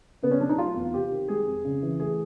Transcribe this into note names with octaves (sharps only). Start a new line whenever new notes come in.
C#3 B3
C#4
F#3 D4
D#4
A3 F4
E2
C3 G4
D#3
G#3 G#4
F2
C#3
E3
A3 G#4